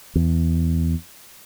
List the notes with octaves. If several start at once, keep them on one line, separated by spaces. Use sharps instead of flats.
E2